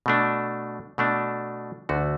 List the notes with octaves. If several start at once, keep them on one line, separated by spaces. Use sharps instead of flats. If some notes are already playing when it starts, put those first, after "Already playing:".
B2 A3 D4
B2 A3 D4
D2 D3 A3 F#4